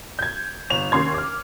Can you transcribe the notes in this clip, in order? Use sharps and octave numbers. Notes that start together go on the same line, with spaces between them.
G6 G#6
G1 E7 F7
D#2 C#4 C6 G#6
D6 F6